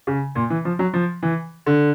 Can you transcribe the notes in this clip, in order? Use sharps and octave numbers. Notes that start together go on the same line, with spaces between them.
C#3
A#2
E3
F3
F#3
F3
E3
D3